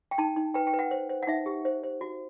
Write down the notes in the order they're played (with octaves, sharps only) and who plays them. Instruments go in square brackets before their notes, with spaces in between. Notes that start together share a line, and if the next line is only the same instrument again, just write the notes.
[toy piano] G5
D#4 A5
D#4
B4 G5
G5
B4
F#5
C5
C5
F#5
D#4 E5
G4
C5
C5
F#4